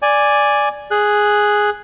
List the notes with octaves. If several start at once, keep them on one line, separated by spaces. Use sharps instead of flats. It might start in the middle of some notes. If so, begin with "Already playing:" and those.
D5 G#5
G#4 F#6